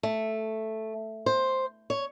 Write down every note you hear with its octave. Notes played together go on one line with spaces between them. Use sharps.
A3
C5
C#5